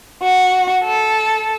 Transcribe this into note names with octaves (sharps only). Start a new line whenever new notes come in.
F#4
A4